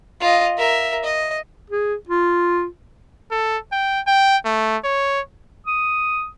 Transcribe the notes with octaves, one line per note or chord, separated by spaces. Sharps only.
F4 D#5
A#4 E5
D#5
G#4
F4
A4
G5
G5
A3
C#5
D#6